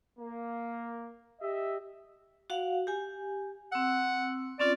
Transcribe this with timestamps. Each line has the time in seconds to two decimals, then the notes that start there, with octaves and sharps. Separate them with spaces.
0.19 A#3
1.41 G4 D#5 E5
2.50 F#4 F5 F#5
2.87 G4 G#5
3.72 C4 F#5 E6
4.60 C4 C#4 F4 D5